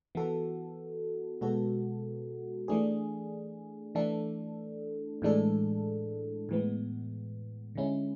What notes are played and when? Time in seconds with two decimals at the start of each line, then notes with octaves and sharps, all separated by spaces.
0.15 E3 B3 F#4 A4
1.41 B2 G#3 B3 F#4 A4
2.68 E3 A3 D4 G#4
3.95 E3 A3 D4 A4
5.22 A2 E3 G#3 D4 A4
6.49 A2 E3 G#3 B3
7.75 D3 G#3 C#4 E4